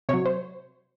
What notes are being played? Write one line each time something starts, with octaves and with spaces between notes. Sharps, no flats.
C3 F#3 C#5
C5